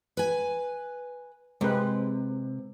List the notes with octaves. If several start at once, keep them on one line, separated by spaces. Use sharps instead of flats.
B4 G#5
C3 G#3 C4 B4